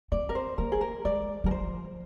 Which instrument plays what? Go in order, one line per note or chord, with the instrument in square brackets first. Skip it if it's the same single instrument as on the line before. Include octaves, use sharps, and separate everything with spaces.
[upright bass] C4 [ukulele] D5
[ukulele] A#4
C5
[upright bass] A#3 [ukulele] A#4
[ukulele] G#4
A#4
[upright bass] G#3 [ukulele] D5
[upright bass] G3 [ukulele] A#4
[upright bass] F3 [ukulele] C5